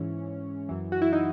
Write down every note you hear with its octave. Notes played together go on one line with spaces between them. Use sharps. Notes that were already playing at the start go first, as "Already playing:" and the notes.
Already playing: G#2 E3 C#4
F#2 E3
F#4
E4
D#4